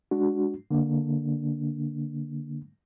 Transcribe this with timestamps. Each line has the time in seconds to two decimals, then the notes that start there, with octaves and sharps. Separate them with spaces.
0.11 G#3 D4 F#4
0.71 D3 A#3 D4